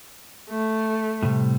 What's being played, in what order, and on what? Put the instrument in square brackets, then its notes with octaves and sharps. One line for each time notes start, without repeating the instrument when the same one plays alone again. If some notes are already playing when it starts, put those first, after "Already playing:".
[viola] A3
[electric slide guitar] A2 C3 G3